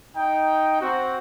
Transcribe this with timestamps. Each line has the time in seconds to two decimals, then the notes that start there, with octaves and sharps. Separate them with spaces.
0.16 D#4 G5
0.81 C4 F#4